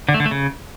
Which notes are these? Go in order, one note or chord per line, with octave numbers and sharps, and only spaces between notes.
D3
A3
D3
A3
C#3